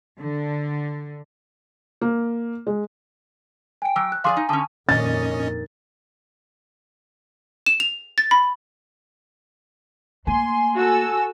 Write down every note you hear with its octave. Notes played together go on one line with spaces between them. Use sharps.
D3
A#3
G#3
G5 G#5 D7
F#3 D6 E6 F6
F#6
F3 G#4 D5 F5 G#5 C6 D6
D#4
D3 C#4 A5 D6 D#6
F2 A#2 D#3 C#4 D4 D#5 A6
E7
F7
A6
B5
A3 A#3 G#5 C6
F#4 A4 E6